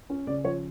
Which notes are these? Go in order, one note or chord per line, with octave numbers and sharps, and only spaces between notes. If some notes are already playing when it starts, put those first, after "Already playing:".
C#4
C#3 D5
F3 C#5